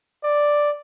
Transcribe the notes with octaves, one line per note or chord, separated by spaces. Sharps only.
D5